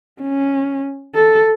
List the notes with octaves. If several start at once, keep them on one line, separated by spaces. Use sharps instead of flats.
C#4
A4